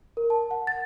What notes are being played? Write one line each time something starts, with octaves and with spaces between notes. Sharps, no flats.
A#4
A5
F#5
A6